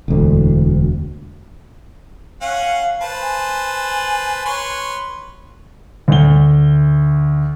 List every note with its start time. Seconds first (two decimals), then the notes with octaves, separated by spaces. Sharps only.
0.08 E1 D2
2.41 C#4 F5 F#5
3.01 B4 C5 A5
3.22 G#5
4.45 B4 C#5 C6
6.08 D2 G7